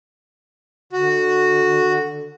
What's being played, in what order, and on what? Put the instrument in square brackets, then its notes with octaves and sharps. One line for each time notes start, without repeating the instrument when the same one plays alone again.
[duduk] D3 [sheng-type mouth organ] F#4